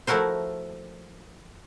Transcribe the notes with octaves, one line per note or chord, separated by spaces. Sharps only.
F3 A3 E4 F#4 A#4 C5